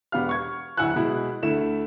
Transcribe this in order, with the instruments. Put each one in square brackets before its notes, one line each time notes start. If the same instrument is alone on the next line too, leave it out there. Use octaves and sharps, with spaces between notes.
[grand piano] E1 B3 G4 F5 F6
C#6 G#6
D1 E4 F#5 G#5 E6 F#6
B2 G#3 E4
D2 A3 E4 E7